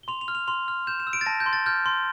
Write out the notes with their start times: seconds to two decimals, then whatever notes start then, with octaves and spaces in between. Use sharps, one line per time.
0.03 G7
0.08 C6 F7
0.21 F7
0.28 F6
0.35 F7
0.47 C6 F7
0.68 F6
0.87 G6 E7
1.00 E7
1.07 E6
1.13 D7
1.21 A6
1.26 A5 A#6
1.40 G6
1.46 C6
1.53 A6
1.66 F6 G6
1.86 C6